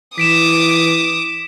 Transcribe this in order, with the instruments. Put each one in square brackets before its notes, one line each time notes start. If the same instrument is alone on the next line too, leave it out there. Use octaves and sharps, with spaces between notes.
[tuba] E3 [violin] D6 D#6 [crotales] B6 D7 E7